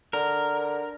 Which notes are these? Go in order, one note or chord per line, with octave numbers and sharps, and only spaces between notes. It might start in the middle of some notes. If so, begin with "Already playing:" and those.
D3 A#4